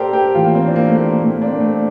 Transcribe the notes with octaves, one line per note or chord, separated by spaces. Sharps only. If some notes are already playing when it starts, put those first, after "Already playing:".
Already playing: A#2 G4 A4 A#4 C5 D5
G4
A2 E3 F4
A#3
C4
D4
A#3
A3
A#3
A#3
A#2 A3
A#3
D4
C4
A#3
A3